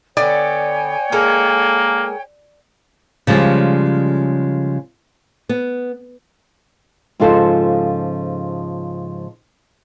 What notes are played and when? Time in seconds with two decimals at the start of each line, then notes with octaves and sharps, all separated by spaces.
0.17 D3 B3 C#5 D5 G5 G#5
1.12 G#3 A#3 A4 A#4
3.27 C#3 F3 G3 G#3
5.49 B3
7.20 G#2 C#3 F3 F4 A4 C5